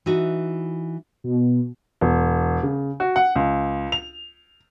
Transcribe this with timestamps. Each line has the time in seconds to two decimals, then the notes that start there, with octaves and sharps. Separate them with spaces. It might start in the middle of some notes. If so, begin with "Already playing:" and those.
0.06 E3 D#4 F#4
1.24 B2
2.01 E1
2.63 C#3
3.00 F#4
3.16 F#5
3.36 C#2
3.92 F7